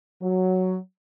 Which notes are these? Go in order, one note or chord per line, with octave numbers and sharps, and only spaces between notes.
F#3